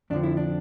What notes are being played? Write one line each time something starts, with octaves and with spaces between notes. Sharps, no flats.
F2 D3 F3 D4
E4
D4